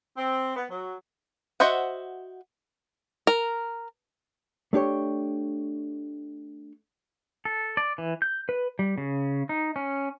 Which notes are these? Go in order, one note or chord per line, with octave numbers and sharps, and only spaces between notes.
C4
B3
F#3
F#4 C5 D#5 E5 F#5
A#4
A3 D4 G4 C#5
A4
D5
E3
G6
B4
G3
C#3
D#4
C#4